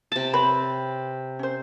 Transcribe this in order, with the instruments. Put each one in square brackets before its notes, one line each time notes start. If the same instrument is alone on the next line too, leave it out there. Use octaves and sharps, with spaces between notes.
[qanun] C3 A5
[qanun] C4 [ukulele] B4 C#5 B5
[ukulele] C#4 C5